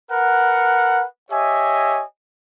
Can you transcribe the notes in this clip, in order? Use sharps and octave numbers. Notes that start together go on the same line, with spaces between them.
A#4 B4 F#5
G4 C#5 D#5 E5 G#5